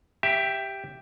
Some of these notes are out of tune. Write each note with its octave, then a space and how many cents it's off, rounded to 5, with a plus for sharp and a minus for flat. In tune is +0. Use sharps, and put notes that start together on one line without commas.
G4 +0 E5 +10